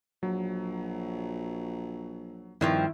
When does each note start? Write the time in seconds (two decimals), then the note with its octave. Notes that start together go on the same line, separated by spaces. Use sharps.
0.23 A#1 F#3
2.61 G2 D#3 F3 C4 E4 C#6